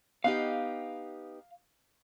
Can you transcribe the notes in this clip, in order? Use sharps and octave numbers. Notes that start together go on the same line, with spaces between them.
B3 D#4 G4 F5